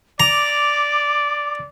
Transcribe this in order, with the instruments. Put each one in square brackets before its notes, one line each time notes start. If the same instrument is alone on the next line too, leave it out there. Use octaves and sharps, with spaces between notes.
[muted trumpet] D5 [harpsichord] A#5 [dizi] D6